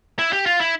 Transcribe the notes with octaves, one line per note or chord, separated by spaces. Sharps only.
E4
G4
F4
E4